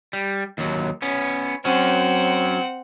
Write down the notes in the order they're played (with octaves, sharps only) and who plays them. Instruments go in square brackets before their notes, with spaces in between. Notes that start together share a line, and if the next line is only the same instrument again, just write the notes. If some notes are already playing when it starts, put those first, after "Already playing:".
[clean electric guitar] G3
D#2 F#3
B3 C#4
[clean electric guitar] F#3 C#4 [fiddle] C4 F#5